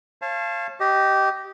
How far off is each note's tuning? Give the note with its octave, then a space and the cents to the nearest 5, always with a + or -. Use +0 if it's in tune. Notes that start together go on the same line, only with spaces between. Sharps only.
C#5 -40 F5 -25 A5 -15
G4 -15 D#5 +0